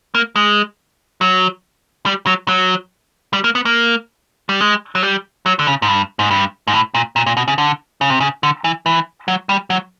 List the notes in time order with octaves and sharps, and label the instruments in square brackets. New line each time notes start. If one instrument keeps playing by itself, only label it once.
[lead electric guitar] A#3
G#3
F#3
G3
F#3
F#3
G3
A#3
B3
A#3
G3
G#3
F#3
G3
F#3
D3
C#3
G#2
G2
G#2
G2
G#2
A2
A#2
A#2
A#2
B2
C#3
D3
C#3
C3
C#3
D3
E3
E3
F#3
G3
F#3